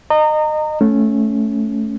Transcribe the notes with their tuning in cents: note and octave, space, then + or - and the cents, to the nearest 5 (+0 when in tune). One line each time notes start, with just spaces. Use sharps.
D#5 -25 A#5 -30
A3 -10 C#4 +0